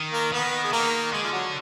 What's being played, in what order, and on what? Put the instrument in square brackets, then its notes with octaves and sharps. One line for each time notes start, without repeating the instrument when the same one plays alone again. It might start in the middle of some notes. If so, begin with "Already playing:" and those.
Already playing: [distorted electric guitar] D#3
[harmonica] A#3 A#4
[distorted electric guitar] D#3 [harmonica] B3 B4
[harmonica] G#4
[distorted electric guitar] D#3 [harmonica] A#3 A#4
[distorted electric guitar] D3 [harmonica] G#3 G#4
[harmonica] F4
F#3 F#4